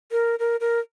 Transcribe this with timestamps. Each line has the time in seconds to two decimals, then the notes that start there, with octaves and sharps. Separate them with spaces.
0.11 A#4
0.39 A#4
0.60 A#4